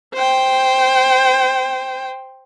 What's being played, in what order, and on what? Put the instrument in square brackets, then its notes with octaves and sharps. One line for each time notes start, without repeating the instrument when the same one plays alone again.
[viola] C5 G5